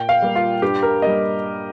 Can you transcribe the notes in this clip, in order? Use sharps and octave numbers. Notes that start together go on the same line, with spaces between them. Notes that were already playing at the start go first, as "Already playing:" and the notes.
Already playing: A#2 G5
F5
G3 A#3
F4
G2 G4
A#4
G3 A#3 D#5